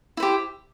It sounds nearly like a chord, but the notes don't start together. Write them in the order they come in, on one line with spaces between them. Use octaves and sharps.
E4 C5 G4